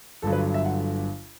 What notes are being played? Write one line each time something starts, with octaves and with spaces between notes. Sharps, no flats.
G1 G2 D3 F#3 A4
B4
E5
F#5